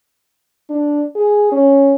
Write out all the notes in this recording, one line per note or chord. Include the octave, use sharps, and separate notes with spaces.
D4
G#4
C#4